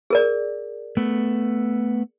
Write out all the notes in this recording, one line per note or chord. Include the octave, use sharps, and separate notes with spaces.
G#4 A#4 D5
A3 B3